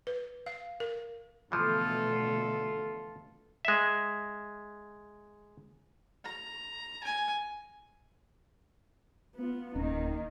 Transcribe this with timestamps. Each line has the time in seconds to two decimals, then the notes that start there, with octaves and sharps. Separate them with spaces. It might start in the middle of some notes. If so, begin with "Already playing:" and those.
0.07 B4
0.46 F5
0.80 A#4
1.52 B2 D3 E3 F3 A3 F4 A4
3.65 G#3 E5
6.25 A#5
7.04 G#5
9.36 B3 F4
9.75 D1 D#3 A#3 C#4 D#4